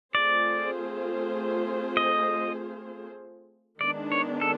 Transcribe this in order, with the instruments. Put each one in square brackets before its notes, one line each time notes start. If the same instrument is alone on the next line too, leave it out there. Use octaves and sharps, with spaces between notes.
[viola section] A3 C4 F4 G#4 C5 [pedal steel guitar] D5
[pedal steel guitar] D#5
[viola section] D#3 G#3 B3 D4 [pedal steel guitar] D5
[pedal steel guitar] C#5
A4